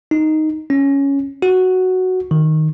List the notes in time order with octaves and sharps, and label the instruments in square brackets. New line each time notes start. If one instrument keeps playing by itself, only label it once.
[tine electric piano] D#4
C#4
F#4
D#3